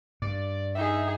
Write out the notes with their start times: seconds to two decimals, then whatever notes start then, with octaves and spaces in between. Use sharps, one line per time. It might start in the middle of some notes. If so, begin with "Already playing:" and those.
0.22 G2 D5
0.75 D#4 G#4 E5